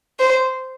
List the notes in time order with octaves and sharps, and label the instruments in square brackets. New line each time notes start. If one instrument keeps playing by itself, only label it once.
[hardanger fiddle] C5